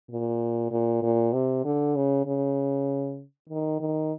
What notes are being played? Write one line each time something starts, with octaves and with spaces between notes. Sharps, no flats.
A#2
A#2
A#2
C3
D3
C#3
C#3
D#3
D#3